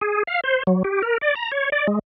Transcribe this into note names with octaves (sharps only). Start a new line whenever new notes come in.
G#4
F5
C5
F#3
G4
A#4
D5
A#5
C#5
D5
G#3